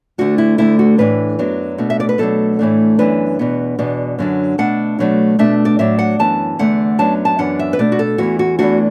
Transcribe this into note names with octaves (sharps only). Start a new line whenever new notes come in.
D2 D3 A3 D4 F#4
E4
D2 D3 A3 E4
F#4
A2 E3 D4 B4
F#2 F#3 B3 D4
B2 A3 D4
E5
D5
B4
B2 F#3 A3 D4 A4
A2 E3 A3 D4
F#2 E3 B3 D4 B4
E2 B2 B3
E2 B2 B3 D4
F#2 D3 F#3 D4
B2 A3 D4 F#5
B2 F#3 A3 D4
B2 A3 D4 E5
D5
A2 F#3 D4 E5
F#5
F#2 E3 B3 A5
E2 D3 A3 F#5
F#2 F#3 B3 D4 A5
A5
F#2 E3 B3 D4 F#5
E5
B4
B2 A3 D4 D5
F#4
A4
E2 E3 B3 F#4
F#4
E2 E3 A3 D4 F#4